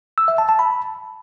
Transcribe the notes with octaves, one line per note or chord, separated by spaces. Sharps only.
E6
E5
A5
A5
B5